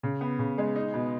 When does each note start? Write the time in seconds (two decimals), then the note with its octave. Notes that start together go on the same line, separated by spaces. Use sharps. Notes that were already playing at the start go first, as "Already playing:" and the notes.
0.03 C#3
0.21 B3
0.39 C#3
0.58 G#3
0.75 D#4
0.94 B2